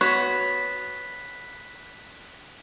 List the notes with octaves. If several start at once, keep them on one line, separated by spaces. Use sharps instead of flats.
B3 F#4 C#5 F#6 B6